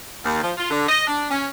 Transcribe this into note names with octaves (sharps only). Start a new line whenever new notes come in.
D#2
F3
F4
D3
D#5
D4
C#4